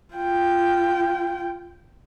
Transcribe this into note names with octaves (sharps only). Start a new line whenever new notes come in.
F4 G5